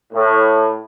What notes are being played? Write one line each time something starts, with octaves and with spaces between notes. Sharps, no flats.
A2